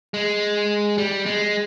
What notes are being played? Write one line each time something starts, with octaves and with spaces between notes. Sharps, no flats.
G#3
G3
G#3